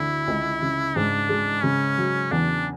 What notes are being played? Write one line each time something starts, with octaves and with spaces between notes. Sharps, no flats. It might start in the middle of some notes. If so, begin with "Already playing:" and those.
Already playing: D2 D3 E4
C#2
C#3
G#2 D4
G#3
C#3 C#4
F#3
E2 D4